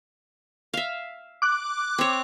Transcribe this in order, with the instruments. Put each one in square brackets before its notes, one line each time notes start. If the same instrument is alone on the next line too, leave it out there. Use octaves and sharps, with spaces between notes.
[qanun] E5 F5
[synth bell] D6 F#6
[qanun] C4 C#5